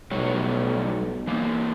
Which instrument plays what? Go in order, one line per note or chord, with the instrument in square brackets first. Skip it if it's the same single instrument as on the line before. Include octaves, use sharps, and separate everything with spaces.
[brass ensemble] B1 [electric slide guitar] A2 G3 C#5
[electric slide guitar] E3 A#3